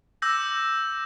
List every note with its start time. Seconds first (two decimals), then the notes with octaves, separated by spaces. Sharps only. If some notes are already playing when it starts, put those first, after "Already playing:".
0.22 D6 E6 G6 A#6